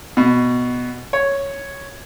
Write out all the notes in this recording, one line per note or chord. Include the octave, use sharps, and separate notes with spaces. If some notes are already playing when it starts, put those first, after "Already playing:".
B2
C#5